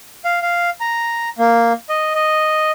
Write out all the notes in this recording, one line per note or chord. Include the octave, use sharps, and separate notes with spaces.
F5
F5
A#5
A#3
D#5
D#5